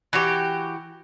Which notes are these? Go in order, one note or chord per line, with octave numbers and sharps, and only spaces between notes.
E3 F#4 G4